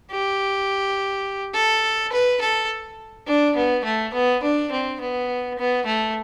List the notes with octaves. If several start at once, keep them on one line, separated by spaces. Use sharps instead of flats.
G4
A4
B4
A4
D4
B3
A3
B3
D4
C4
B3
B3
A3